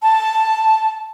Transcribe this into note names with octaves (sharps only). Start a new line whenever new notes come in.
A5